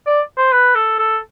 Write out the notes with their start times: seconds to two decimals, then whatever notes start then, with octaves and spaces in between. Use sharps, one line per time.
0.06 D5
0.37 C5
0.52 B4
0.75 A4
0.99 A4